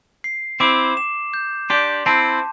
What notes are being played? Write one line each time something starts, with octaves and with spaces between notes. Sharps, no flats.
C7
C4 E4 D6
E7
G6
D4 G4 C6
C4 E4 A5